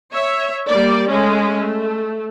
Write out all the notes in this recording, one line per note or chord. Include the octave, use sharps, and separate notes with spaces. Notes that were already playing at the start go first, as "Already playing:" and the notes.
C#5 E5
G3 A#3 D5
G#3 A3 C#4
A3